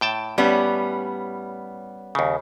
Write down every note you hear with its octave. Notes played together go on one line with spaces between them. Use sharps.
A2 G5 A5
A2 G3 B3 C#4
D#2 C#3